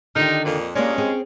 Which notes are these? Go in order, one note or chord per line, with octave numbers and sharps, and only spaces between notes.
D3 D#3 D#4 F4 G4 A#4
F2 A#2
G2 A#2 G#3 A#3 C#4 C#5 D5
C4 G#4 C#5